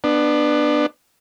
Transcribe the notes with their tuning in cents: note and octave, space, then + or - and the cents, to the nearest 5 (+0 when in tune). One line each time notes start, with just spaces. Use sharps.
B3 +0 D4 +20